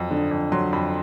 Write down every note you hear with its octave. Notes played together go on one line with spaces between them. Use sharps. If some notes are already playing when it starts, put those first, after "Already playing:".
Already playing: F2 F#3
D3
F2
F#3 C6
F2 B5